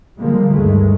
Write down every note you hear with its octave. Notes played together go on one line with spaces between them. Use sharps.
D3 F3 G3 G#3 A#3
D2 G2 D#3 G#3 A3